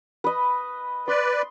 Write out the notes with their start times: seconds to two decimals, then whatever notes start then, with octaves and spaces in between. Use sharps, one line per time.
0.24 B4 D#5
1.08 B4 D5 C6